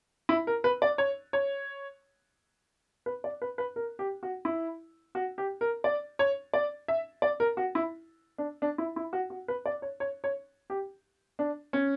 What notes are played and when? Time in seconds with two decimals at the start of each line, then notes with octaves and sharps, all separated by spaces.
0.29 E4
0.47 A#4
0.64 B4
0.82 D5
0.98 C#5
1.33 C#5
3.06 B4
3.24 D5
3.42 B4
3.58 B4
3.76 A#4
3.99 G4
4.23 F#4
4.45 E4
5.15 F#4
5.38 G4
5.61 A#4
5.84 D5
6.19 C#5
6.54 D5
6.88 E5
7.22 D5
7.40 A#4
7.57 F#4
7.75 E4
8.38 D4
8.62 D4
8.78 E4
8.96 E4
9.13 F#4
9.30 F#4
9.48 B4
9.66 D5
9.82 C#5
10.00 C#5
10.24 C#5
10.70 G4
11.39 D4
11.73 C#4